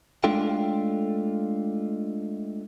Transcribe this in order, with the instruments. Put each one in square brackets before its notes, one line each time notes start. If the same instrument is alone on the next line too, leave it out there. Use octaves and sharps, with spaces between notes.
[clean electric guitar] G#3 A3 D4 F4 A4 G5